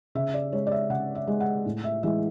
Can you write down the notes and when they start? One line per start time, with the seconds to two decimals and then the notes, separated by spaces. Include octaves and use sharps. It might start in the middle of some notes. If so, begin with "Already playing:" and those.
0.15 C#3 E5
0.34 D5
0.52 G#3 C#5
0.67 D5
0.72 E5
0.90 C#3 F#5
1.15 E5
1.27 G#3
1.40 F#5
1.66 A2
1.84 E5
2.03 E3 G#3 E5